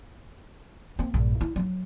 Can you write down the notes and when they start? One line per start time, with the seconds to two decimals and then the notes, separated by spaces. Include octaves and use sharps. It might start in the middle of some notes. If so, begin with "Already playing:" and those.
0.99 A#3 C4
1.14 A#1 G2
1.41 E4
1.56 F#3 D#4